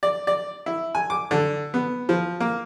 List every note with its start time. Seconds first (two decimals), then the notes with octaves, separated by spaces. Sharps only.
0.03 D5
0.27 D5
0.66 E4
0.95 G#5
1.10 D6
1.31 D3
1.74 B3
2.09 F3
2.40 A#3